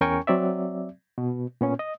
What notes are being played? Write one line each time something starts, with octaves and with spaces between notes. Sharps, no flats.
E2 C#4 A#4 G5 G#5 C#6
F#3 C4 D5 E5
B2
A#2 B3 C#4
D#5